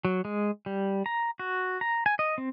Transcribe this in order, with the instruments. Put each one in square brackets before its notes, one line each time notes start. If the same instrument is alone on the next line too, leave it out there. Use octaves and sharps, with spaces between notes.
[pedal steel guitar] F#3
G#3
G3
A#5
F#4
A#5
G#5
D#5
C4